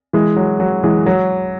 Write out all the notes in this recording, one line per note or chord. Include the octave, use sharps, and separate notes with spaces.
E3 G#3
F#3
F#3
E3 G#3
F#3